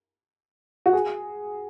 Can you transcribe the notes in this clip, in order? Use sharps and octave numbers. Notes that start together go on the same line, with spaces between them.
F#4
G#4